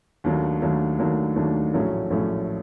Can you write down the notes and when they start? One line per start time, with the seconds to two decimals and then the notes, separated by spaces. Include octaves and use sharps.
0.24 D#2 D#3 F#3 A3 D4
0.61 D#2 D#3 F#3 A3 D4
0.98 D#2 D#3 F#3 A3 D4
1.36 D#2 D#3 F#3 A3 D4
1.74 A#1 A2 F#3 A3 C#4
2.10 A#1 A2 F#3 A3 C#4